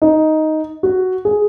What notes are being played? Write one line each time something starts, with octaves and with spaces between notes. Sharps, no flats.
D#4
F#4
G#4